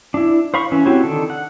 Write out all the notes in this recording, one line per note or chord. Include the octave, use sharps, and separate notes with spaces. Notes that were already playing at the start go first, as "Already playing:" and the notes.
D4 E4
C5 F5 B5 C#6
E3 C#4
C4 E4 F#4 G4 C#5
D3 D#3 A4
F#5